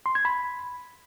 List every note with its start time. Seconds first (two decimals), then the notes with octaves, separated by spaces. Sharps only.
0.06 C6
0.15 G#6
0.25 B5